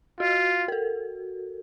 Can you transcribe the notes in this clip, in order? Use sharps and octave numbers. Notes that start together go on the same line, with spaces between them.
F4 F#4
A#4
A4